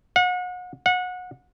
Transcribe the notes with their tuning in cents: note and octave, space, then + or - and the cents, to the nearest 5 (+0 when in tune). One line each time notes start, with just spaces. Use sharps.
F#5 -35
F#5 -25